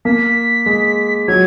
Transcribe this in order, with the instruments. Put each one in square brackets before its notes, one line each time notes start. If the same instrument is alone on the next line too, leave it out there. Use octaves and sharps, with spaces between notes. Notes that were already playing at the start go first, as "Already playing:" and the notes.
[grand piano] A#3 [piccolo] B6
[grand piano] G#3
[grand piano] F#3 [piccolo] G#6